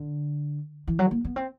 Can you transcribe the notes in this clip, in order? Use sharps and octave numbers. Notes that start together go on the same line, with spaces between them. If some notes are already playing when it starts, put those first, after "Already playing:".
Already playing: D3
E3
F#3
A#3
B3
C4